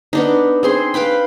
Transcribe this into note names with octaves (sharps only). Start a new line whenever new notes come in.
B3 D4 D#4
C4 G#4 C6
B4 F5 G5 B5